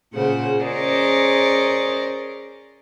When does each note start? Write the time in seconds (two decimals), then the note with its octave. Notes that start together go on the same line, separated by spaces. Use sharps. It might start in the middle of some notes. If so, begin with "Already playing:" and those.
0.13 A#2 C#3 C5 F#5
0.63 C#4 G#4 A#4 C5 D5 D#5